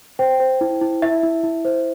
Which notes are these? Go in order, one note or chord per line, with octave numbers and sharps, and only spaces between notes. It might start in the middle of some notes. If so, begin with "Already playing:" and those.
C5 G5
C5
E4
E4
E4 E5
E4
E4
C5